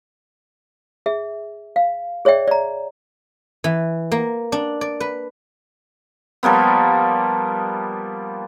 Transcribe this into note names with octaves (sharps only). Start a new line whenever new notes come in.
G#4 E5
F5
G#4 C#5 D5 E5 G5
D5 A#5
E3
A#3
D4
D5
B4
F3 G3 A#3 B3